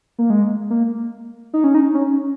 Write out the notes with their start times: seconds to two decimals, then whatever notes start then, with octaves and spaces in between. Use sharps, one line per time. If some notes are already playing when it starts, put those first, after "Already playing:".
0.19 A#3
0.30 G#3
0.70 A#3
1.54 D#4
1.64 C#4
1.75 D#4
1.94 C#4